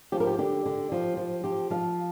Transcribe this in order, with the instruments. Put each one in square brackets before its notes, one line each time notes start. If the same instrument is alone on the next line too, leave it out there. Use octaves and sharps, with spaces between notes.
[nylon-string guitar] F3 G4
A#4
G4
D3 G4
D3
F3
F3
F3 G4
F3 F5